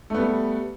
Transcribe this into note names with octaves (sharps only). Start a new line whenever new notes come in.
G3 A3 B3